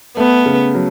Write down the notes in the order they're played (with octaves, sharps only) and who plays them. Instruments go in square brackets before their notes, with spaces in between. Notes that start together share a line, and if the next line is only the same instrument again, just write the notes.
[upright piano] A3 [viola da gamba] B3
[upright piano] C#3
F#3